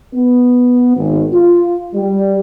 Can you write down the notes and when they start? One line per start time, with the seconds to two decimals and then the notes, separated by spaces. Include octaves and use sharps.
0.14 B3
0.97 G#1
1.33 F4
1.94 G3